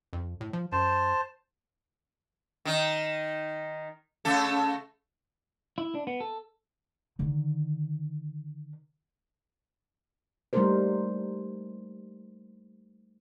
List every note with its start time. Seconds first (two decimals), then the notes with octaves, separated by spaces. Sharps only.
0.13 F2
0.41 A2
0.53 F3
0.72 F#2 C5 A5
2.65 D#3 D#4
4.25 C#3 A3 A4
5.78 E4
5.95 D4
6.07 B3
6.20 A4
7.19 D3 D#3
10.53 G3 A3 A#3 D#4 A#4 C5